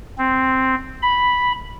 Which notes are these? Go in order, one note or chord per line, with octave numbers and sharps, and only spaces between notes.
C4
B5